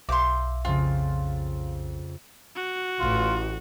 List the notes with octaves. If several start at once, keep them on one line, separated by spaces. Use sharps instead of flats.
B1 E5 F5 C6 D6 G6
F2 C#3 F4
F#4
A1 F4